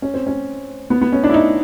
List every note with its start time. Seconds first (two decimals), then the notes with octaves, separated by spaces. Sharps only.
0.02 C#4
0.14 C4
0.27 C#4
0.90 B3
1.01 B3
1.12 C#4
1.24 D4
1.29 E4
1.34 D#4